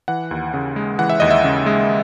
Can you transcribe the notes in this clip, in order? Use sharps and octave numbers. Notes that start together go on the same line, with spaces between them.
E3 F#5
D#2
C#3
G#3
E3 F#5
E5
D#2 D#5
E5
C#3
G#3